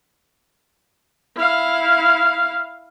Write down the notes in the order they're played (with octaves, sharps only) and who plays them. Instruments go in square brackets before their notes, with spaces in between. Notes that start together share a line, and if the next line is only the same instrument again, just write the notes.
[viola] E4 F5